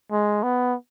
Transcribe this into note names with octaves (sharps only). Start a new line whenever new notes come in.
G#3
B3